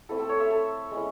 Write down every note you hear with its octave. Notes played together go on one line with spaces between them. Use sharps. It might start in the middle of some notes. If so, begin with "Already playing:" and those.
A3 C4 E4 A4
A4
C#5
E5
A4
G#3 C#4 E4